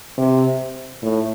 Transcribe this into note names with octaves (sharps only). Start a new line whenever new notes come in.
C3
A2